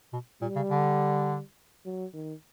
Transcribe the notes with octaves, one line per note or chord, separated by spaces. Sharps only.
B2
A#2 G3
C#3
D3
F#3
D#3